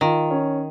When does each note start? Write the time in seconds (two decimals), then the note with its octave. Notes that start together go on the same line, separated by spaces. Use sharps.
0.01 D#3 F4
0.30 C#4